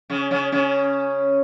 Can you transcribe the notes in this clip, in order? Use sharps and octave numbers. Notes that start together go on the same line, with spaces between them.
C#3 C#4
C#3 C#4
C#3 C#4